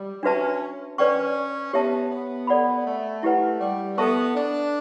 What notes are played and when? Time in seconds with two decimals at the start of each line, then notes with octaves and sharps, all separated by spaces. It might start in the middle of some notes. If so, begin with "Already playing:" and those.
Already playing: G3
0.23 C#4 D4 F#4 B4 E5 A5
0.98 C#4 B4 D5 G5 C#6
1.73 B3 G4 C#5 E5 A5
2.11 B3
2.47 A4 D5 F#5 B5
2.85 A3
3.23 E4 G4 B4 F#5
3.60 G3
3.98 B3 A4 E5 A5 C#6
4.35 D4